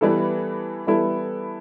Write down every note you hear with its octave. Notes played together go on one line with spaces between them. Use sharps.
E3 G3 B3 E4 A4
E3 G3 B3 E4 A4